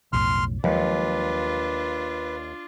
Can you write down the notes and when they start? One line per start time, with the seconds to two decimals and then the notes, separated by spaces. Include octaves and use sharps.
0.13 B1 F2 A2 C6 F6
0.64 D#2 F3 F#3 G#3 D4 F4 B4